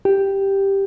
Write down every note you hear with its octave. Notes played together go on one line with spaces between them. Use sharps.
G4